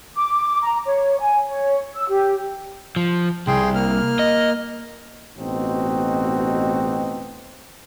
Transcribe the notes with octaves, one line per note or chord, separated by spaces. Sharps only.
D6
A#5
C#5
G#5
C#5
E6
G4
F3
C2 G#4 G5 C6
A#3 F6
D#5
A1 B2 C4 D#4 F#4